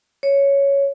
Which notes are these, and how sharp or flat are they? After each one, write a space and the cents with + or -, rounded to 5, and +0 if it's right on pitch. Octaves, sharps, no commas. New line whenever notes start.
C#5 +5